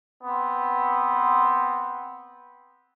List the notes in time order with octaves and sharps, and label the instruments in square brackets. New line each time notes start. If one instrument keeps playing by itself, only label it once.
[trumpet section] B3 C4 C6